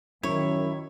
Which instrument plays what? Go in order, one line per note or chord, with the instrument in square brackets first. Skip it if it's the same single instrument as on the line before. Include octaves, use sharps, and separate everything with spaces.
[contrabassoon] F#2 [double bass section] D#3 [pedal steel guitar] E4 [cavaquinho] C#5